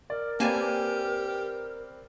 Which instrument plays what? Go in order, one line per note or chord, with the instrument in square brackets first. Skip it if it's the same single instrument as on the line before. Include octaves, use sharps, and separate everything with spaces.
[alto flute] A#4 [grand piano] D5
[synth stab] A#3 G#5 A5 [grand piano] C4 B4 D5 [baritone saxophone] G4